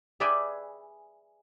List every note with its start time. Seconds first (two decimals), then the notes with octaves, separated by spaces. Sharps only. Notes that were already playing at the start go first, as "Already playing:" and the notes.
0.20 G#4 B4 D5 E5 G5 G#5